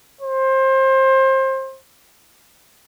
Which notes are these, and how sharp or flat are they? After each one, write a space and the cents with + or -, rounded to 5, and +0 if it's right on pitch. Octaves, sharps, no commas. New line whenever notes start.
C5 +25